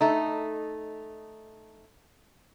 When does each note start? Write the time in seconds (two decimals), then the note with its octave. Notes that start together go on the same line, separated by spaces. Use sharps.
0.01 A3 D#4